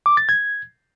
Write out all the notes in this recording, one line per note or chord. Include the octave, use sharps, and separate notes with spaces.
D6
A6
G#6